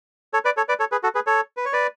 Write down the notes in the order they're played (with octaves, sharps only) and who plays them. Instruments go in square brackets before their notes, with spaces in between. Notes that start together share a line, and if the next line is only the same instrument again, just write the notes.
[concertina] A4 C#5
B4 D5
A4 C#5
B4 D5
A4 C#5
G#4 B4
F#4 A4
G#4 B4
A4 C#5
B4
C#5
B4 D5